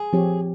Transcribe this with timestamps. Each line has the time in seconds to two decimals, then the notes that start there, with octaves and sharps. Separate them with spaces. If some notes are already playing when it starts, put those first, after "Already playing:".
Already playing: G#4
0.13 F3 C4 G4 C#5